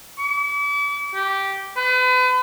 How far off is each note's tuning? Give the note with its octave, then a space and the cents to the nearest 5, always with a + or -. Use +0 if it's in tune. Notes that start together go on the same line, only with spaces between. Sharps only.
D6 -40
G4 -10
B4 +40